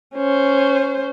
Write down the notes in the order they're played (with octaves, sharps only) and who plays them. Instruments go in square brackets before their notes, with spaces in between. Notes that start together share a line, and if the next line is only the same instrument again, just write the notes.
[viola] C#4 C5